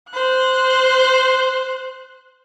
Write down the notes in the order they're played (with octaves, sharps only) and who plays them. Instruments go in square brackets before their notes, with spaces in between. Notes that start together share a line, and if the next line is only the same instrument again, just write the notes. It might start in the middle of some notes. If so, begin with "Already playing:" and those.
[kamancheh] C5 F#6